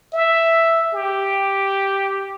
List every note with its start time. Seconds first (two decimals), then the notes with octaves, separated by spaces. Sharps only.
0.13 E5
0.93 G4